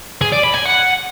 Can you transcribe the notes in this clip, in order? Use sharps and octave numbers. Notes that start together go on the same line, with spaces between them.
G#4
D5
B5
G#5
F#5